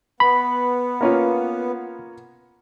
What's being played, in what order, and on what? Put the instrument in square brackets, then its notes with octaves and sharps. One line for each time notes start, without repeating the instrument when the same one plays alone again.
[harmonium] B3 [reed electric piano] B5
[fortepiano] A#3 C#4 F4